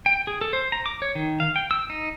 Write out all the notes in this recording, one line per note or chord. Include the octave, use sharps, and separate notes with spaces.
G5
G#4
A4
C5
A#5
D6
C#5
D#3
F5
G5
E6
D#4